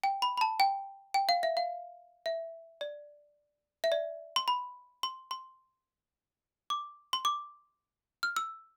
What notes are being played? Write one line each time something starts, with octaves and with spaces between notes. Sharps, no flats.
G5
B5
B5
A5
G5
G5
F5
E5
F5
E5
D5
E5
D5
C6
B5
C6
C6
D6
C6
D6
F6
E6